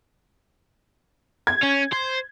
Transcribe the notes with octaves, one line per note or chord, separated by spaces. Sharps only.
G#6
C#4
C5